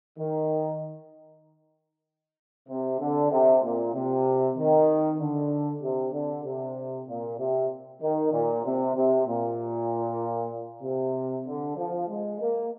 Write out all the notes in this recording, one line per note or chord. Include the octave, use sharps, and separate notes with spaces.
D#3
C3
D3
C3
A#2
C3
D#3
D3
C3
D3
C3
A#2
C3
D#3
A#2
C3
C3
A#2
C3
D3
F3
G#3
A#3